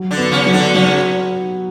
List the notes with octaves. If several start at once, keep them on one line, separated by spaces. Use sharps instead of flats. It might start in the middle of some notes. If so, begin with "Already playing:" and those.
Already playing: F#3
D3 D4
B3
C#3 C#4
F#3
D3 D4
C#3 F#3 C#4